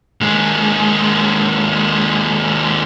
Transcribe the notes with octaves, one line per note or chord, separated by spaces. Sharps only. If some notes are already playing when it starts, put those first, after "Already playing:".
D#2 G#3